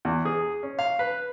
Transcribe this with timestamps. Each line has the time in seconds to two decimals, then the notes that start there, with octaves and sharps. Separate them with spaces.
0.05 E2
0.25 G#4
0.63 C#4
0.79 F5
0.99 B4